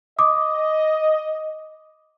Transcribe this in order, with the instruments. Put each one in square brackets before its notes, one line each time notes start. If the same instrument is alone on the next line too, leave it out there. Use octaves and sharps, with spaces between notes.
[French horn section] D#5 [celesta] D6 D#6